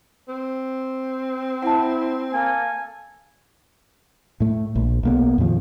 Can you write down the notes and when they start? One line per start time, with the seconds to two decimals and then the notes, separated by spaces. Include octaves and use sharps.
0.28 C4
1.62 E4 F#5 A5
2.31 A#3 A4 G#5
4.40 A2 A3
4.75 A#1
5.03 B1 A#3 B3
5.38 F2 A#2 D#3 F3